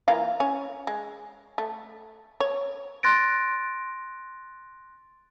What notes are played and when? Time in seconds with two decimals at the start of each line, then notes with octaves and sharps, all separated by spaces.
0.08 E3 A#3 F4
0.40 C#4
0.87 G#3
1.58 A3
2.40 C#5
3.03 C6 F#6 A6 A#6 D7